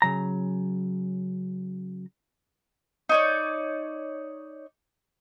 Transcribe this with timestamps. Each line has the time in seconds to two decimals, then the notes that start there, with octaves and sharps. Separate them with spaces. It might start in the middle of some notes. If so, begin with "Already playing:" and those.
0.02 C#3 F#3 A#5
3.09 D#4 C#5 D5